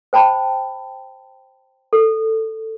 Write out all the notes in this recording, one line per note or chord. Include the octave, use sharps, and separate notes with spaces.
C5 G5 A5 B5
A4